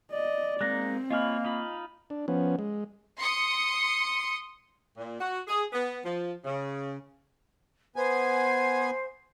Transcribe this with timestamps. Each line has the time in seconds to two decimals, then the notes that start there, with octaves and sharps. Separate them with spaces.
0.12 D5 D#5
0.61 G#3 A#3 C4 D#4 F#6 A#6
1.10 A#3 F4 C#5 D#5 G#5 B5 F6
1.45 D#4 F4 B5
2.10 D4
2.28 F3 B3 C#4
2.59 G#3
3.19 C6 D#6 C#7
4.96 A#2
5.19 F#4
5.47 G#4
5.73 B3
6.04 F3
6.45 C#3
7.96 B3 C5 G#5